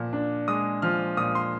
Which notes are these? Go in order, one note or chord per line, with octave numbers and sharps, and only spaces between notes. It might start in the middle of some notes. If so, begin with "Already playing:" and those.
Already playing: A#2 F3
D4
G#3 D#6
F3 F6
A#2 D#6
C6